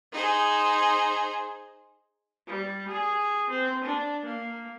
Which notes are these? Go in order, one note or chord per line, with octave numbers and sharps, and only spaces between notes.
D#4 G#4 C5
G3
G#4
C4
D4
A#3